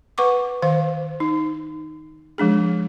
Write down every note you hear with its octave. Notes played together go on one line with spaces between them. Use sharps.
B4 F#5 C#6 D6
D#3 C5 F5
D#4
F3 G#3 D4 G#4